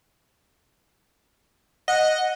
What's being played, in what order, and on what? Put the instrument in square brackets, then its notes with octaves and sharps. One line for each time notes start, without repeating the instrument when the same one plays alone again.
[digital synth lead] D#5 [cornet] F#5